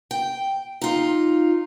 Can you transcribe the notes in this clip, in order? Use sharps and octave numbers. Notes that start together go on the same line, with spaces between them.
G5
D#4 F4